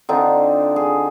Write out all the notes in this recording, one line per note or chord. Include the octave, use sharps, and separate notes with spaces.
D3 C4 D#4 F4
G#4